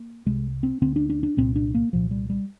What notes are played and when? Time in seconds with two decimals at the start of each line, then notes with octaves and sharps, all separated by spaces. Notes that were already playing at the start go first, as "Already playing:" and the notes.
Already playing: A#3
0.26 C2 C3 G#3
0.63 C4
0.82 D2 D3 C4
0.96 D4
1.10 D4
1.23 D4
1.37 C2 A#2 C4
1.56 D4
1.75 A#3
1.93 C2 A#2 F3
2.11 G3
2.30 G3